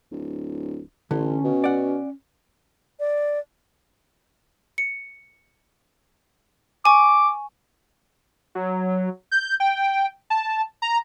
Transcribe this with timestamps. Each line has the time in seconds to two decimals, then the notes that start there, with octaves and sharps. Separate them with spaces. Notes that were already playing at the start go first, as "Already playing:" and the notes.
0.11 D1
1.11 A1 D3 C#4
1.44 B2
1.64 D5 F#5
3.00 D5
4.78 C#7
6.85 G#5 C#6 D6
8.55 F#3
9.31 G6
9.60 G5
10.30 A5
10.82 A#5